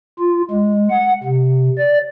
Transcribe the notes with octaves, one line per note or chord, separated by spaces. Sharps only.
F4
G#3
F#5
C3
D5